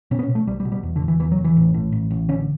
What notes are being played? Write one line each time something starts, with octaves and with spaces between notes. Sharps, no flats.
B2 C#4
B3
C#4
B2
A3
B1 G3
G3
B2
G3
E2
D3
E1
E3
E2 E3
F#3
E1
E3
A1
A2
A1
A1
D3 C#4